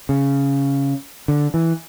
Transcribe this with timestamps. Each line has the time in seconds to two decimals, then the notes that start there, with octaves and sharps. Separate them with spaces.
0.09 C#3
1.28 D3
1.54 E3